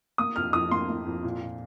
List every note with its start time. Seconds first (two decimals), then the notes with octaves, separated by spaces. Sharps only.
0.18 A#3 D#6
0.36 F2 F6
0.53 F2 D#6
0.71 A#3 C6
0.89 A#3
1.06 F2
1.24 A#2
1.41 A#2